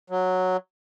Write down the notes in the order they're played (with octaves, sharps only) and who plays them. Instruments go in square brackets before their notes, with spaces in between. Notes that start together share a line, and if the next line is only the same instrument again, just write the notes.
[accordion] F#3